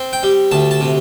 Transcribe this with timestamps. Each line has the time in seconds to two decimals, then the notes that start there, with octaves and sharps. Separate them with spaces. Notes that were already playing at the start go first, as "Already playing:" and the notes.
Already playing: C4
0.13 G5
0.23 G3
0.51 D2 A5
0.71 A5
0.81 C3